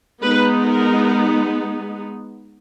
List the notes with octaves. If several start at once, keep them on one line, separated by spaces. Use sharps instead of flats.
G#3 B3 D#4 B4
A#4